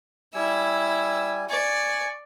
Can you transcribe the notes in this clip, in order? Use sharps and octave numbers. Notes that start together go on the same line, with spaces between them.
G3 E4 G#5 E6
D5 G#5 C#6